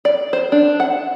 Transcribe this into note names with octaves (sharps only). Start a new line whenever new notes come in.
D5
C5
D4
F#5